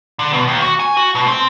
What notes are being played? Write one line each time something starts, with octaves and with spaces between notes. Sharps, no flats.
D3
B2
D#2
F#4
G#5
F#4
B2
C4